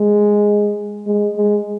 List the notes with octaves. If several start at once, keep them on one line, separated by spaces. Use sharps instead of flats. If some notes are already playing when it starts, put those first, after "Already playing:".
Already playing: G#3
G#3
G#3